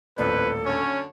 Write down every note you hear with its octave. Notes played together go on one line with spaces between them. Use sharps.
D#1 A1 F2 A4 B4 D5
F#2 D3 C#4 C#5